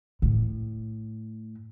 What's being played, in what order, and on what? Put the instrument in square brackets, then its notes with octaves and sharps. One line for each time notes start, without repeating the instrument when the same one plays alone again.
[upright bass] A2